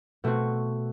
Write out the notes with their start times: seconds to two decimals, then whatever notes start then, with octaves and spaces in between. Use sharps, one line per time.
0.24 B2 A3 C4 F#4